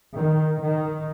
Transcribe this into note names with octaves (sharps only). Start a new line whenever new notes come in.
D#3
D#3